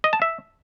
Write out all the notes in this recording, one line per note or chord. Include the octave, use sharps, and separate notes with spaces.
D#5
A5
E5